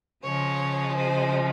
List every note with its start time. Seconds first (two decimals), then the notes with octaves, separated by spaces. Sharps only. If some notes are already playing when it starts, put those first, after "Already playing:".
0.23 C#3 F3 G#3 C#5
0.96 C5